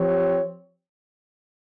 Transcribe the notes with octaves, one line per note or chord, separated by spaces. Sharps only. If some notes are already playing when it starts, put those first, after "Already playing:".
Already playing: F3 C4 G4 C#5